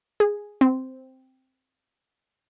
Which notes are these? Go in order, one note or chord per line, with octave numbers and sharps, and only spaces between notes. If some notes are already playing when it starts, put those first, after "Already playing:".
G#4
C4